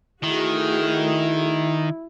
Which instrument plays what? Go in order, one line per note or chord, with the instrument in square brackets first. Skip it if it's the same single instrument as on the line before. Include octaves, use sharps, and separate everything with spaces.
[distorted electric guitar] D#3 [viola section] A3 F#4 G#4 [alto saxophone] E4